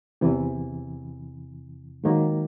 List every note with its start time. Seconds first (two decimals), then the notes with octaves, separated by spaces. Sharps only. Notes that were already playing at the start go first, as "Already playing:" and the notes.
0.21 E2 C3 E3
2.04 G#2 D#3 F#3 A#3